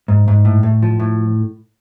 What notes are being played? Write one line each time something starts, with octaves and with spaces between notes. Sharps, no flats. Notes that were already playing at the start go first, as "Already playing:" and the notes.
G#2
G#2
A2
A2
F3
A2